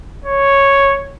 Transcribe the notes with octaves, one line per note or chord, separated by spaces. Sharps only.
C#5